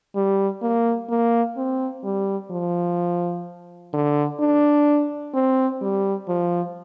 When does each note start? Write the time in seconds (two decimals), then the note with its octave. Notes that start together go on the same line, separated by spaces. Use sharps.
0.16 G3
0.62 A#3
1.09 A#3
1.57 C4
2.04 G3
2.51 F3
3.93 D3
4.40 D4
5.34 C4
5.81 G3
6.28 F3